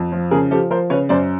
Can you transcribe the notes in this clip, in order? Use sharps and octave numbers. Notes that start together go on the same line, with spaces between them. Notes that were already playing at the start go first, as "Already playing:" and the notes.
Already playing: F2
F3
C#3 G#4 A#4
F3 G4 A4
F3 A#4 C5
C#3 B4 C#5
F#2 C5 D5